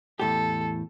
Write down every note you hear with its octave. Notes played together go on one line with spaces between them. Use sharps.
E2 A2 G4 A4